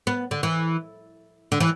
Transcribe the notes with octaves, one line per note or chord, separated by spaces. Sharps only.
B3
D3
E3
D3
E3